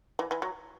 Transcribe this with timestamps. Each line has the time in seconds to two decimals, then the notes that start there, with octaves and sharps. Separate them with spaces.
0.19 E3
0.31 E3
0.42 F#3